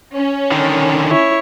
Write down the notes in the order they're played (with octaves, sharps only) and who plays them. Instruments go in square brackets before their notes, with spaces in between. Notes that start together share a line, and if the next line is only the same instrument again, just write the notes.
[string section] C#4
[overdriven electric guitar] D3 D#3
[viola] E4 C#5